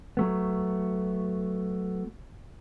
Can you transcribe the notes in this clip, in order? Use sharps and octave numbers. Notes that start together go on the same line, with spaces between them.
F#3 A3 B3